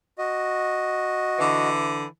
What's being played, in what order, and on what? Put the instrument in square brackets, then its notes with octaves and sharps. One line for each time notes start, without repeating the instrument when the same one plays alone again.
[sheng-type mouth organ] F#4 D#5
[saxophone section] D3 E3